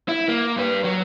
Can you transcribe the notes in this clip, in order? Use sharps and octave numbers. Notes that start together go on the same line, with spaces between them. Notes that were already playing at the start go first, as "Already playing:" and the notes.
E4
A#3
G2 B4
F#3